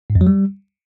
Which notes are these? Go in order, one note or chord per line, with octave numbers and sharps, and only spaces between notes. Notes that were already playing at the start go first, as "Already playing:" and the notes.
G#2
F2
F#3
G3